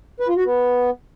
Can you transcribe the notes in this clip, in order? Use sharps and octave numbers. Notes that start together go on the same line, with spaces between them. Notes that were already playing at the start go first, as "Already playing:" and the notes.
B4
F4
F#4
B3